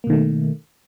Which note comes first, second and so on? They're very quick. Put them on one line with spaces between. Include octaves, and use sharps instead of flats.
A#3 B2 D#3 A3